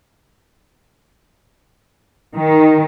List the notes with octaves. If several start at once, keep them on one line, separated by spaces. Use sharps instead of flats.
D#3